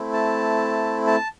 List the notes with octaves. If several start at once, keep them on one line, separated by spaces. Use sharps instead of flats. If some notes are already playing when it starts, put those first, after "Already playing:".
Already playing: A3 C4 E4
A5
A5